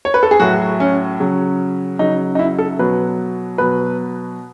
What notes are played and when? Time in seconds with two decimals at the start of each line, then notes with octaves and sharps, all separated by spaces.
0.05 C#5
0.14 B4
0.23 A4
0.31 G#4
0.40 A2 F#3 F#4
0.80 C#4
1.20 C#3 F#3
1.99 C#3 F#3 D#4
2.35 D#4
2.39 E4
2.58 A4
2.79 B2 F#3 B4
3.58 B2 F#3 B4